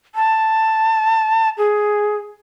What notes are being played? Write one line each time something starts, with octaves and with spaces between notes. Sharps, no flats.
A5
G#4